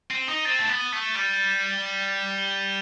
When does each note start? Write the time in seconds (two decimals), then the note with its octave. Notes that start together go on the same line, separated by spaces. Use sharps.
0.10 C4 D#7
0.28 D#4 G7
0.45 C4 A6
0.59 A3 A6
0.69 B3
0.80 D#7
0.93 A3
0.99 G7
1.15 G3 A6
1.33 A6
1.50 E7
1.68 G7
1.86 A6
2.03 A6
2.21 E7
2.38 G7
2.56 D#7